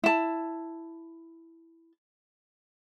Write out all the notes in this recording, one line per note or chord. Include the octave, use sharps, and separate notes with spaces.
E4 A5